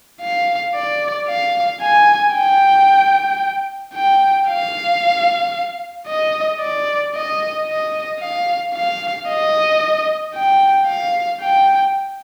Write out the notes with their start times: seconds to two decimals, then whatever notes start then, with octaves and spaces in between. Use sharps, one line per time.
0.21 F5
0.74 D5
1.28 F5
1.81 G#5
2.35 G5
3.94 G5
4.48 F5
6.07 D#5
6.61 D5
7.14 D#5
7.67 D#5
8.20 F5
8.74 F5
9.28 D#5
10.34 G5
10.87 F5
11.41 G5